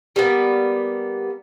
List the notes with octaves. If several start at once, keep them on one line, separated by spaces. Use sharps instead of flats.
G3 A#3 B3